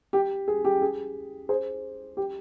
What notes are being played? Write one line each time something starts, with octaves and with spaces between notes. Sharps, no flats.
G4
G#4
G4
G#4
G#4 C5
G4